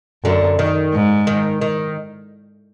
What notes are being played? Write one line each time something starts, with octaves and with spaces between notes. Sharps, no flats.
F#2 D3
D#3
G#2
D#3
D#3